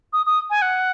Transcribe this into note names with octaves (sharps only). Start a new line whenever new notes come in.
D#6
D#6
G#5
F#5